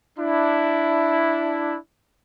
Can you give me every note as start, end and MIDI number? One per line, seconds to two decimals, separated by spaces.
0.19 1.77 62
0.19 1.77 64